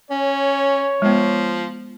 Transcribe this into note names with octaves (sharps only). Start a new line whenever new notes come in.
C#4 C#5
F3 G#3 B3